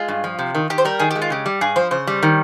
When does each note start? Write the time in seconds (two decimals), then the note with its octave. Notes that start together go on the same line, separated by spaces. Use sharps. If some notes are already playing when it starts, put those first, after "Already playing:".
Already playing: G#3 F4
0.08 G2
0.24 F3
0.39 C3
0.55 D#3
0.70 D#3 G4
0.78 C5
0.85 G3 A#4
0.99 D#3 G#4
1.11 G#3 G4
1.22 F4
1.30 C#3 G4
1.46 G3
1.61 G2 G#4
1.76 F3 C5
1.91 C#3 C5
2.07 G3
2.23 D#3